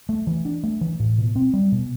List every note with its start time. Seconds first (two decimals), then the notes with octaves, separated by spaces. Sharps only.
0.09 A3
0.27 E3
0.45 D4
0.63 A3
0.81 E3
1.00 A2
1.18 B2
1.36 C4
1.53 G3
1.72 B2